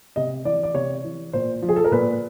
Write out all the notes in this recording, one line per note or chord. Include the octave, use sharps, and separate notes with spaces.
C3 D#5
E3 D5
D5
C3 C#5
E3
A#2 C5
F3
G#4
A4
A#4
A#2 B4